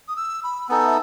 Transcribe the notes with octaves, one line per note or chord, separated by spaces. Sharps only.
D#6
E6
B5
B3 D#4 A4 G#5
E5